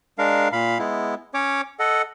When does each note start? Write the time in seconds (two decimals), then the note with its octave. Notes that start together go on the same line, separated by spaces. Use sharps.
0.18 G#3 D4 A#4 F5
0.53 A#2 F5 B5
0.79 G#3 B3 E4
1.34 C#4 C#5 D6
1.79 A4 D#5 F#5